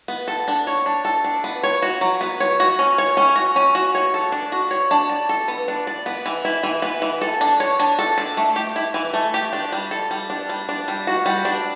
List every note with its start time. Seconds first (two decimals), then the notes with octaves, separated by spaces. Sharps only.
0.08 B3
0.28 A4
0.48 D4
0.67 C#5
0.86 D4
1.05 A4
1.24 D4
1.44 B3
1.63 C#5
1.82 F#4
2.01 F#3
2.21 B3
2.40 C#5
2.60 F#4
2.79 C#4
2.98 C#5
3.17 C#4
3.36 F#4
3.56 C#4
3.75 F#4
3.95 C#5
4.14 A4
4.32 D4
4.52 F#4
4.71 C#5
4.91 D4
5.09 D5
5.29 A4
5.48 B3
5.68 D4
5.87 D5
6.06 B3
6.26 E3
6.45 E4
6.63 E3
6.82 B3
7.02 E3
7.21 A4
7.41 D4
7.60 C#5
7.80 D4
7.99 A4
8.18 D4
8.37 A3
8.56 G4
8.76 E4
8.94 E3
9.14 A3
9.34 G4
9.53 D4
9.72 G3
9.91 A4
10.11 G3
10.30 D4
10.49 G3
10.69 D4
10.88 G3
11.07 F#4
11.26 G3
11.45 D4